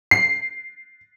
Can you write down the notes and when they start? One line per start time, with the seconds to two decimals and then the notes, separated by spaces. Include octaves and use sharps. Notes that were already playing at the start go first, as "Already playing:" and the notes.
0.11 C7